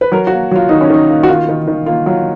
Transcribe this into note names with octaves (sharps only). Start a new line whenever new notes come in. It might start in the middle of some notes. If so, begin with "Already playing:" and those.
B4
F#3 A#4
F#4
A#3
F#3 F4
D#3 D#4
C#4
D#3 D#4
A#3
F#4
D#3 F4
D#3
D#3
A#3 F4
F#3 F4